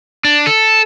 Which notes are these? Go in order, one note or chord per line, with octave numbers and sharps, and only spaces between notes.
D4
A4